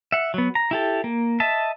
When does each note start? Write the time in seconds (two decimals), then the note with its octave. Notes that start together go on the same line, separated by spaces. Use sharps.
0.12 E5 F#5
0.34 F#3 B3
0.55 A#5
0.71 E4 G4 A4
1.04 A#3
1.40 D#5 E5 A5